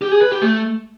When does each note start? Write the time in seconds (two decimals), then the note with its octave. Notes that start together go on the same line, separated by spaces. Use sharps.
0.02 G4
0.12 G#4
0.22 B4
0.32 G4
0.42 A3